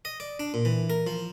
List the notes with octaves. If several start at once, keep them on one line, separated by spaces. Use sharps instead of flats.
D#5
D5
D4
A#2
E3
A#4
F3